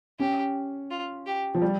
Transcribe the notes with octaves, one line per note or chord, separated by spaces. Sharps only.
C#4 G4
F4
G4
F3
G3